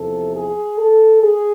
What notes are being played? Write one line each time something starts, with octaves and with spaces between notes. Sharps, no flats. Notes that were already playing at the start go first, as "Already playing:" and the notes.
Already playing: E2 C3 F3 A4
G#4
A4
G#4